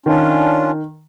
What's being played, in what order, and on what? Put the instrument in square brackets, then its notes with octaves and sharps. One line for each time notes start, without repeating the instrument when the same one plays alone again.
[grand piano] D#3 [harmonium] C#4 D4 F4